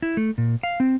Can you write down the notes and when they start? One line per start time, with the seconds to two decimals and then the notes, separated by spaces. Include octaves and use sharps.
0.02 E4
0.17 A3
0.38 A#2
0.63 F5
0.80 C4